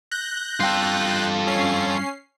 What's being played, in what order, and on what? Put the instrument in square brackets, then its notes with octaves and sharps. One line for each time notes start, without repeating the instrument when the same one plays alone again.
[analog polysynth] F#6 G6 A#6
[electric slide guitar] G2 G5 [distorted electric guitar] F4 A4
[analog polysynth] C#4 C7